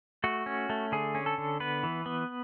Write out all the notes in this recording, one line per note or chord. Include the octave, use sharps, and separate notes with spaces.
A3 F#4
C#4
A3
D3 G#4
C#4
A4
D3
B3 B4
E3
B3